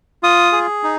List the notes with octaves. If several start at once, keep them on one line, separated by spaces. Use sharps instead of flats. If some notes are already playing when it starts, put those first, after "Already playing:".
F4 D#6
G#4
D#4